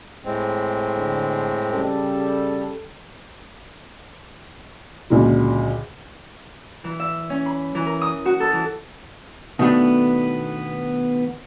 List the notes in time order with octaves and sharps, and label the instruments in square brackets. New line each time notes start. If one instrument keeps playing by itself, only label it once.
[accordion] A2 G#3 C4
[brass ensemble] D3
C#3 G3 A4
[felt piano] C#2 A#2 D3 F#3
[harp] E3
E5
C#4
B5
E3
A#4
D#6
F#4
A4
E3
[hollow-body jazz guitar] B2 D#3 A3 B3 D4